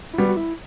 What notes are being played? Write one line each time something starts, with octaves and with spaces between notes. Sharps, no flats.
E4
G3 B3 F#4
F#4
E4